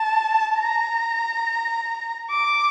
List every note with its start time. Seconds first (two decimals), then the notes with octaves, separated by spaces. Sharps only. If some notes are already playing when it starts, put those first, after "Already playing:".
Already playing: A5
0.58 A#5
2.30 D6